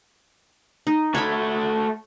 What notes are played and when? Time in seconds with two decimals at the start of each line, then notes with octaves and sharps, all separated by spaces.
0.87 D#4
1.15 A3 F#4 C#5 E5 B5